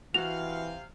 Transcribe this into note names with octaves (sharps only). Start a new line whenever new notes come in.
C3 E3 F#4 F5 F7